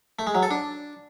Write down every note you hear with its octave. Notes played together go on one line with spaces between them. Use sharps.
A3
G#3
F#3
A4
D4